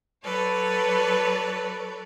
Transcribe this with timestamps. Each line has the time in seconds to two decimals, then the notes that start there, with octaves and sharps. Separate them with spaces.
0.24 F#3 A4 B4 C#5 D5